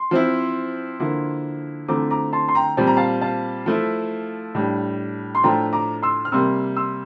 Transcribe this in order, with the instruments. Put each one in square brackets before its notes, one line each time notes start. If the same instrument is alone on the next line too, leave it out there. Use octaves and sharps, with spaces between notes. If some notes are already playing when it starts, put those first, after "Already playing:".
Already playing: [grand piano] C6
[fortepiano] F3 C4 E4
D3 F3 A#3 E4
[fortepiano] D3 F3 A3 C4 E4 [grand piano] A#5 D6
[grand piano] A#5 D6
A5 C6
C6
G5 A#5
[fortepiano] A#2 G3 C4 [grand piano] A5
[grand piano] A#5
F5 A5
F5 A5
[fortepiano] F3 A3 E4
A2 G3 D4
[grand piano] C6
[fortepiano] A2 F3 A3 D4 [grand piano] G5 A#5
[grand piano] A#5 D6
C6 E6
F6
[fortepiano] C3 G3 A#3 [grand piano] C6 E6
[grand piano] C6 E6